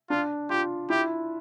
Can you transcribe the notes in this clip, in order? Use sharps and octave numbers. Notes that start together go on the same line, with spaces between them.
D4 F4
F4 G4
E4 G4